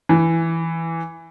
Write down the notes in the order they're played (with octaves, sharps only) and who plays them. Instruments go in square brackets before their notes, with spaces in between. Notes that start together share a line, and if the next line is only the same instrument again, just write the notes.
[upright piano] E3